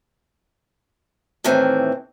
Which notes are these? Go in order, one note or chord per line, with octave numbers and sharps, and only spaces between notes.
A2 D#3 E3 C4